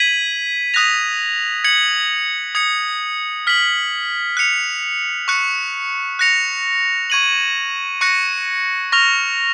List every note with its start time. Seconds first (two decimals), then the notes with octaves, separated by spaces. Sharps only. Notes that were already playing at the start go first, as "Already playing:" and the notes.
Already playing: G#6 B6 D#7 F#7
0.74 D#6 F#6 A#6 F7
1.64 G#6 C#7 F#7
2.55 D#6 G#6 C#7
3.47 F6 B6 F#7
4.37 F#6 C#7 F7
5.28 C#6 F#6 C#7
6.19 F#6 A#6 C#7 F7
7.10 C#6 G#6 D#7 F#7
8.01 C#6 F#6 A#6 C#7
8.92 C#6 F6 A#6 F7